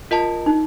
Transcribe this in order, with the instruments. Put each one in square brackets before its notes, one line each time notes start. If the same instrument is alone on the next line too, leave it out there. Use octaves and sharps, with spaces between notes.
[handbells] F4 A#4 D#5 A5
[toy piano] D#4